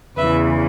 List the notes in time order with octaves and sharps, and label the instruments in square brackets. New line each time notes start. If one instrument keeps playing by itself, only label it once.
[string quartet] E2 C#3 E3 B4 E5